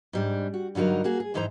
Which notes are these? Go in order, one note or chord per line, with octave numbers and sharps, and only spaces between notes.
G#2 G3 D4
F#4
G2 D3 F#3 D#4 A#4
A#3 F#4 G#4
G#4
F2 G#2 E3 D#4 C5 A#5